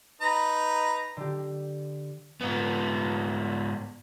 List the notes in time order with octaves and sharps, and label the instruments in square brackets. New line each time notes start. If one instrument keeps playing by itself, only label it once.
[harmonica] D#4 B4 A#5
[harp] D3 G4
[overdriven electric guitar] G#2 B3